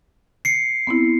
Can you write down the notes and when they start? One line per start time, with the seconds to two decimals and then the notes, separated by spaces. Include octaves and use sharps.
0.45 C7 C#7
0.87 B3 C4 E4